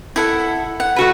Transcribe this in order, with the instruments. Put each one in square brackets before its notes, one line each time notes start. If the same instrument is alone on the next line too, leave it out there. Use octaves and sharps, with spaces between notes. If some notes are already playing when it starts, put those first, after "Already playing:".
[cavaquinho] E4 A4 F#5
F#5
[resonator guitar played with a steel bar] A3 F#4 B4